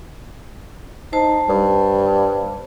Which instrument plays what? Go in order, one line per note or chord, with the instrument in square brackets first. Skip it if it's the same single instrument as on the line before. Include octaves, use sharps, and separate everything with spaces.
[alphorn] D#4 [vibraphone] C5 A5
[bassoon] G2 [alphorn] G3